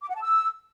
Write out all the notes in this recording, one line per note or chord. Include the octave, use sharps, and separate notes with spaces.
D6
F#5
A5
E6